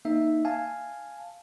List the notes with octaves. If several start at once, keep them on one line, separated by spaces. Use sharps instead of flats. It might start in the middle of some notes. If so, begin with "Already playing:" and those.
A#3 D#4 E5
F5 G#5 A5